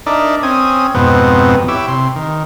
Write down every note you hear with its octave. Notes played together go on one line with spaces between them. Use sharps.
D4 D#4 A#4 D5 E5
C4 C#4 G#5 D#6
F2 G#2 B2 B3 C4
E4 G4 C#5 D6 E6
C3 C6
D#3